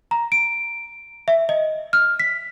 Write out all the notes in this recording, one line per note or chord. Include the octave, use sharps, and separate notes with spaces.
A#5
D7
E5
D#5
F6
B6